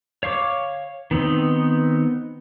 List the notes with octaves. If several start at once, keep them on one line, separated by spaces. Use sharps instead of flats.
C#5 F5 C#6 D6
D#3 B3 C4 D#4